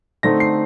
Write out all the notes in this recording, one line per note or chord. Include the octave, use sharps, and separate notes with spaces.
D3 A3 C4 D#4 A#6
C7